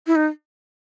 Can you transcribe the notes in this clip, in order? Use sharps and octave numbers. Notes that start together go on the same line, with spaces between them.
E4
D#4